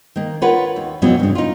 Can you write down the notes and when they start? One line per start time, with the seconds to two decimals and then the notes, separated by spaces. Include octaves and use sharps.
0.16 D#3 A#3
0.42 F4 A#4 B4 C#5 F#5
0.76 D#2
1.02 F2 B2 E3 F#3 B3 C#4
1.19 G2 C#3
1.35 D#4 F4